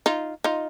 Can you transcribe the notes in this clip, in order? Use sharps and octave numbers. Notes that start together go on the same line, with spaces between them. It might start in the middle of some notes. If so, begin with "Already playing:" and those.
D#4 F4
D#4 F4